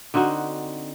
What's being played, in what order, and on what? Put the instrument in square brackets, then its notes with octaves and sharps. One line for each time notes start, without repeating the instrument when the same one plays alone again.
[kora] D3 C4 D#4 F#4